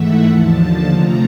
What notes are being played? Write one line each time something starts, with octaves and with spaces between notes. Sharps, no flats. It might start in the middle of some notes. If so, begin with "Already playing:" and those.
Already playing: G#2 E3 A3 E5 F#5
D#2 D3 F3 A5
C3 F3 A3 C4 A#5